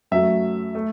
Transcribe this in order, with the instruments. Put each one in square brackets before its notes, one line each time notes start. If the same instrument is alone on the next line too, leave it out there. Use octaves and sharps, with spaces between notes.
[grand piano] F#2 F#3 A3 E5
A3